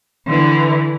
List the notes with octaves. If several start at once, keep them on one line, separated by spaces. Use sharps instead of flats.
D3 E3